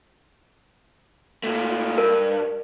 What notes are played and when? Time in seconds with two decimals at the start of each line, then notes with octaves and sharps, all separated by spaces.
1.44 A#2 A3
1.98 G2 A#4